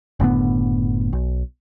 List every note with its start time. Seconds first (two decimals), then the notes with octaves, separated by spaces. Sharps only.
0.20 F#1 A2 D3 B3
1.13 B1